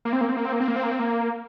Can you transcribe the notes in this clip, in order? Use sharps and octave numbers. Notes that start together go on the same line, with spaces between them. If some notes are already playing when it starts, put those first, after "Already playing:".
A#3
C4
A#3
C4
A#3
C4
A#3
C4
A#3
C4
A#3
C4
A#3